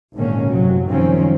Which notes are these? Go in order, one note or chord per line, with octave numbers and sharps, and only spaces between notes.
G#1 A#2 D3 D#3 A#3 C#4
A1 F#2 C3 F#3
F#1 C2 D#3 F3 C4 C#4